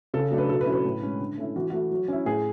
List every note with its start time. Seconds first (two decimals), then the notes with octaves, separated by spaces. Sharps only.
0.14 C#3 A4
0.31 F#3 A3 D4
0.38 B4
0.49 B2 A4
0.61 B4
0.66 F#3 C#4 E4
0.72 B4
0.85 A2
1.03 G#3 C#4
1.20 D3
1.38 A3 C#4 E4
1.56 E3 F#4
1.70 A3 E4 F#4
1.91 F#3
2.08 C#4 E4
2.26 A2 G#4